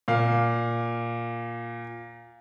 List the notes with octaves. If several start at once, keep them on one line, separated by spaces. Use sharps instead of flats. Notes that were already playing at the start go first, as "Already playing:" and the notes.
A#2 F5